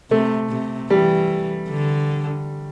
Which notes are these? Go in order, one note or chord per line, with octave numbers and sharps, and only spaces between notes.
C3 A3
C3
E3 G3
D3